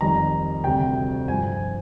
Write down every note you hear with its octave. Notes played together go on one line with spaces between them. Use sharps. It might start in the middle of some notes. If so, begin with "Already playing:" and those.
F2 D#3 G3 A#5
D2 C3 G3 G5
G2 F3 G#5